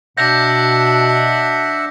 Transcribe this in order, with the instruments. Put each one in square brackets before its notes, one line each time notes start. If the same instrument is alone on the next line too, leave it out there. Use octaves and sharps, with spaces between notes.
[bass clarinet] B2 [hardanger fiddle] D4 [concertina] E5 F#5 [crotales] G6 A#6